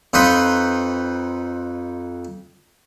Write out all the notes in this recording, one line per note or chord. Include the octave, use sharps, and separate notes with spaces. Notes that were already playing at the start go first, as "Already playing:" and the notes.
F2 D#4 B4 C6